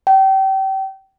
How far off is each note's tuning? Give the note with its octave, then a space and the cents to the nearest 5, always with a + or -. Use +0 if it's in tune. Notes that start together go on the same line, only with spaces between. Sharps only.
G5 -30